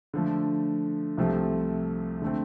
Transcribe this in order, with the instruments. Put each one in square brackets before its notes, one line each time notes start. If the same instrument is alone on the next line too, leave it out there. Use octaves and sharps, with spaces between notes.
[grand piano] D3 F3 A3
C2 C3 F3 A3 C4
D3 A3 C4